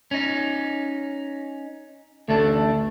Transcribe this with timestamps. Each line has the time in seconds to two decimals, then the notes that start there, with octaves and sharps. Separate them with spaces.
0.11 C#4 D#4
2.29 A1 D2 A3 D4